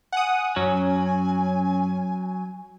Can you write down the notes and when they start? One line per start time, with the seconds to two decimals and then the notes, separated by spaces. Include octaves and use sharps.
0.13 F#5 G#5 D#6
0.56 F#2 F#3 C#4